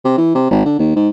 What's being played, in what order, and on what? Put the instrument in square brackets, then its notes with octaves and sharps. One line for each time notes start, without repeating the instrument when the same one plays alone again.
[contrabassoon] C3
E3
C3
G#1
D3
D#2
G#2